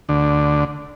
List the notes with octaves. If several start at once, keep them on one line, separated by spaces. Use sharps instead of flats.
D2 D3